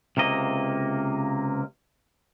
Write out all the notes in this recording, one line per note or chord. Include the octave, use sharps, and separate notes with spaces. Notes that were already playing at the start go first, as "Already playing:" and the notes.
C#2 C3 A#3 D#5